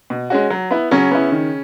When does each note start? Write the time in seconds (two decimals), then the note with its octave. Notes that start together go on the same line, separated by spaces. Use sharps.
0.10 B2
0.30 G#3 C#4 F#4
0.50 F#3
0.71 B3 E4
0.91 C#3 F#3 C#4
1.11 B3 E4
1.32 D#3